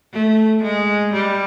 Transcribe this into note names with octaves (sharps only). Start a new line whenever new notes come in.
A3
G#3
G3